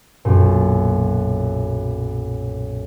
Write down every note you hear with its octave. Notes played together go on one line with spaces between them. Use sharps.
B1 F#2 A#2